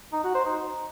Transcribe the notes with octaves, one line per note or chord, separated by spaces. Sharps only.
D#4
F#4
C5
D#4